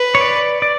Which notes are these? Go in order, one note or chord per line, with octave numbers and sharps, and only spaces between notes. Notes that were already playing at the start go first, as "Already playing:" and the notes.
Already playing: B4
C#5
D5
D5